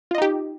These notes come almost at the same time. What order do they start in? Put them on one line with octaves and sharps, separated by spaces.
F4 D#5 D#4 G4